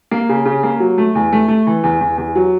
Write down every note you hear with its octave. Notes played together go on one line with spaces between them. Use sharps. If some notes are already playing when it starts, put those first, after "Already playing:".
A#3
C#3
C#3
A#3
F#3
A3
E2
A3
A3
E3
E2
E2
E2
F#3